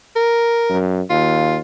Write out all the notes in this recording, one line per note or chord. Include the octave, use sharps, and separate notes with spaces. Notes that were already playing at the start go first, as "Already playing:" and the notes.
A#4
F#2
D#2 F4